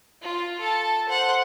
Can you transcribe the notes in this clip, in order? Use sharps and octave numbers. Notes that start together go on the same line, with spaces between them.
F4
A4 A5
C5 F#5